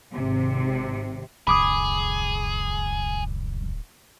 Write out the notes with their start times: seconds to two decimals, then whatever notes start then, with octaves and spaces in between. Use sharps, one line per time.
0.13 G#1 C3
1.47 D1 C2 F2 D3 G#4 B5 D6 D#6